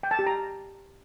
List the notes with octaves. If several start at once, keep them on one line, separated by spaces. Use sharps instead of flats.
G5
A5
G4
A#5